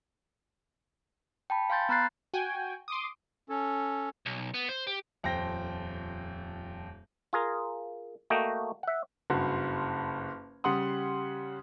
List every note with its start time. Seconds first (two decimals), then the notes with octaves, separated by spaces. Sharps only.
1.50 G5 A5 B5
1.70 F5 G#5 C6 G6 A6
1.89 B3 A#5 B5 F#6 A6 C7
2.34 F#4 G5 G#5
2.88 C6 D6 D#6
3.49 C#4 A4
4.26 B1
4.54 B3
4.69 C5
4.87 G4
5.23 D#1 F2 C5 G5 A#6
7.33 F4 G#4 A#4
8.30 A3 A#3 F#4 D#5 G5
8.83 E5 F#5
9.30 F#1 G2 F#4 C6
10.64 C#3 G3 F#5 C6 D#6